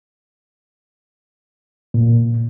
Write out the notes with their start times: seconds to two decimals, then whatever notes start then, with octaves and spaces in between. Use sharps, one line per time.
1.94 A#2